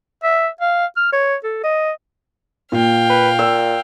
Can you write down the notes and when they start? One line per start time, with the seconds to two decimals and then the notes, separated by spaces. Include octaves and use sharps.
0.23 E5
0.61 F5
0.97 F6
1.13 C#5
1.44 A4
1.64 D#5
2.72 A#2 F5 G5
3.10 B4
3.39 A#2 E6